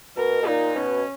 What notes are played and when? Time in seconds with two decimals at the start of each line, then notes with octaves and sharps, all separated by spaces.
0.16 B2 A#4
0.42 B2
0.47 A#2 D#4
0.76 B2 C#4